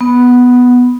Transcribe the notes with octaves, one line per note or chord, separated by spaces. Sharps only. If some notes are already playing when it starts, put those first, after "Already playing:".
B3